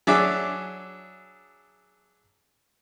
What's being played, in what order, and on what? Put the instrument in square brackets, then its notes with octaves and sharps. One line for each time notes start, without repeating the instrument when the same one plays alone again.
[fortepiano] F#3 D4 G#4 E5 D6